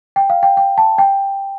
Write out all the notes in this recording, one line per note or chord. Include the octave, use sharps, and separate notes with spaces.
G5
F5
G5
G5
A5
G5